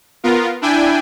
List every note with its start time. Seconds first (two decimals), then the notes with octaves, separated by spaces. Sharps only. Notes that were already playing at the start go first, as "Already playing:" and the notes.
0.23 B3 F4 A#4
0.62 D4 E4 G5 G#5